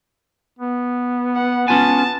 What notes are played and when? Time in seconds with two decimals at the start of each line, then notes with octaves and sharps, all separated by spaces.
0.59 B3
1.36 F#5
1.68 B3 C#4 F4 G#5 A5